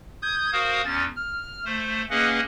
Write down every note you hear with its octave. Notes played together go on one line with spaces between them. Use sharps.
D#6 G6 G#6
F#4 A#4 C5 F5 D#6
E2 C#4 A6
F6
A3 C5
A#3 C#4 G#4 B4 D#5 F#5